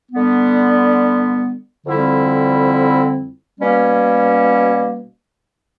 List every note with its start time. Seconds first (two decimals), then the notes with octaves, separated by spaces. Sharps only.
0.12 D3 G3 B3
1.86 F2 D3 G3 C4 E4
3.59 B2 G3 A#3 C#4